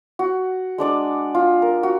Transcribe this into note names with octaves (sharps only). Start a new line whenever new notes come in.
F#4
G#3 D4 D5 D6
F4
A#4
F#4